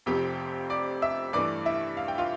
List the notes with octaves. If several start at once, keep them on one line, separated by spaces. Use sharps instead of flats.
F1 F2 C3 F3 C4 G4 G5
D5 D6
E5 E6
G2 E3 A3 D5 D6
E4 E5
F5
G5
F4 F5